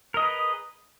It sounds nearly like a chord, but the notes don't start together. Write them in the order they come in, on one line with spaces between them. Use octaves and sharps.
A#4 D#5 G#4 B4